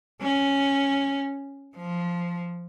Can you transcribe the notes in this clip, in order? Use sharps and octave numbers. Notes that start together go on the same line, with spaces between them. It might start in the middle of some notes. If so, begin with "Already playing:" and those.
C#4
F3